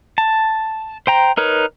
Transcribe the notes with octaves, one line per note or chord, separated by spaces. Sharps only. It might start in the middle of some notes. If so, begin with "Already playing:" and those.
A5
C5 G5 A#5
D#4 A#4 B4 C#5